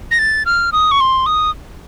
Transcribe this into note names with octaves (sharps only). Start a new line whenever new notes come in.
A#6
A6
F6
D#6
C#6
C6
D#6